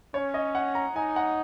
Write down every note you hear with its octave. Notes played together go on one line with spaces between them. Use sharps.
C#4 C#5
D#5
F#5
A#5
D#4 G#5
F#5